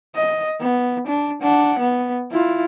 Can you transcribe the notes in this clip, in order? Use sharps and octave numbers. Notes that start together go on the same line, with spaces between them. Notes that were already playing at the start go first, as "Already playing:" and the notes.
D#5
B3
D4
D4 F#5
B3
E4 F4